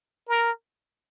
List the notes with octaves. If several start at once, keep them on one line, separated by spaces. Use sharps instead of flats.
A#4